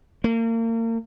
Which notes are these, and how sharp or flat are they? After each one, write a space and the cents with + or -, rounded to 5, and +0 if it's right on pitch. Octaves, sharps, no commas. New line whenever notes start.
A#3 -35